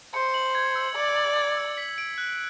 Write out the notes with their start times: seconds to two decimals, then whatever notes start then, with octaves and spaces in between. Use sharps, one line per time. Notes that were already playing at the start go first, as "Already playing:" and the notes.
0.14 C5 C#7
0.34 F#7
0.55 G#6
0.76 E6
0.96 D5 C#7
1.16 F#7
1.36 G#6
1.57 E6
1.78 B6
1.98 D7
2.18 F#6